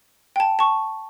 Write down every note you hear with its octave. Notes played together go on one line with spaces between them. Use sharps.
G5 A5
A5 C#6